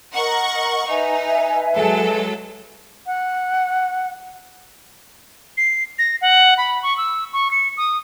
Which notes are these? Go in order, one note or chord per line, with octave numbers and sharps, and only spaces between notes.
A#4 D#5 F#5 A#5 C#6
D#4 B4 E5 G#5
F#3 G#3 A4
F#5
C7
A#6
F#5
B5
C#6
E6
C#6
C#7
D#6